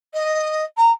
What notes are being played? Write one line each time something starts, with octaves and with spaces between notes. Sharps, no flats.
D#5
A#5